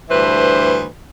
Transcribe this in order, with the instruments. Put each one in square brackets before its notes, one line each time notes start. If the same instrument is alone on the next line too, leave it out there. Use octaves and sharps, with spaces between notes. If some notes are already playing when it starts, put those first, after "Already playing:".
[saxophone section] D2 G2 E3 B4 C5